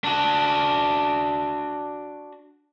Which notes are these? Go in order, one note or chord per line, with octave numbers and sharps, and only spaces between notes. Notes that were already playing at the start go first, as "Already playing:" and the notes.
D4 F#4